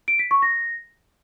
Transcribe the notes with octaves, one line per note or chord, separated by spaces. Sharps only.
D7
B6
C#6
A#6